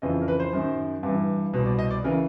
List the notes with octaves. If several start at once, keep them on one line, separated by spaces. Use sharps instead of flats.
F2 C#3 E3 D#5
A#4
B4
C5
F#2 D#3
G2 E3
C2 B2
D5
D#5
D5
C#3 E3 A#4